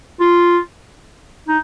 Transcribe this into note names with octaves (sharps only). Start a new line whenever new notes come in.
F4
D#4